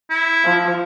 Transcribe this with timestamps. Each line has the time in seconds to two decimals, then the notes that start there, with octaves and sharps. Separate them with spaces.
0.10 E4
0.45 F3